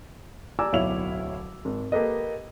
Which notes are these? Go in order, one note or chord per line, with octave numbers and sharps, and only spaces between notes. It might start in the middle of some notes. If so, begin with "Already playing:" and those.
G4 D5 G#5 A#5 D6 E6
D1 B1 E4 C#5 F5 F7
G#1
A#3 G4 A4 B4 D#5